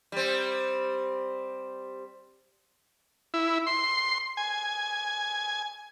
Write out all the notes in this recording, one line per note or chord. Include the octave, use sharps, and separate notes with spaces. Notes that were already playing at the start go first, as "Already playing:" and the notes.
G3 C4
E4
C6
G#5